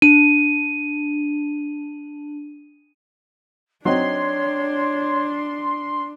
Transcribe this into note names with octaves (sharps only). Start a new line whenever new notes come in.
D4 D#7
F#3 C4 D4 D#4 C#5 C6